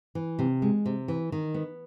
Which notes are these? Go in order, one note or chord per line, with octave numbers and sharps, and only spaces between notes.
E3
C3
G#3
C3
E3
D#3
B3